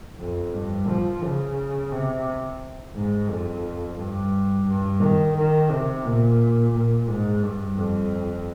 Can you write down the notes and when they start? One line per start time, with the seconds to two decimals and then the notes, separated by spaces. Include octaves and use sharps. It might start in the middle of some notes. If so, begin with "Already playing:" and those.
0.20 F2
0.54 G2
0.88 F3
1.23 C#3
1.92 C3
2.96 G#2
3.30 F2
3.99 G2
4.68 G2
5.02 D#3
5.37 D#3
5.71 C3
6.05 A#2
6.75 A#2
7.09 G#2
7.43 G2
7.78 F2